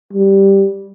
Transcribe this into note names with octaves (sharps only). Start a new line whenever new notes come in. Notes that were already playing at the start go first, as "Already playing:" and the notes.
G3